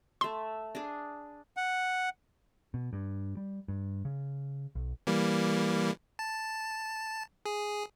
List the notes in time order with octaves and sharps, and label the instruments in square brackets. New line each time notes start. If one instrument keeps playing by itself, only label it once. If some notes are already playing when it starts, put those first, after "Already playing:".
[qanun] A3 E5 [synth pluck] C6
[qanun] D4 G#4
[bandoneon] F#5
[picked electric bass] B2
G2
G3
G2
C#3
B1
[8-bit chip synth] E3 G3 A#3
A5
G#4